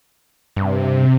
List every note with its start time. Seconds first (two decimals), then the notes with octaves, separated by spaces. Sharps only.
0.56 G2 C3